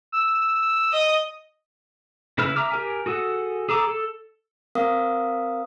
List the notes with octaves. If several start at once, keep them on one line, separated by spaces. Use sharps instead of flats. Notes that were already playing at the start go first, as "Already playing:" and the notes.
E6
D#5 D#6
C#3 E4 B4 F6
E5 A#5 D6 F6
G4 A#4 G#5
F#4 G#4 A4 F#5
G#4 A4 A#5 D6
A4
C4 A#4 F5 D#6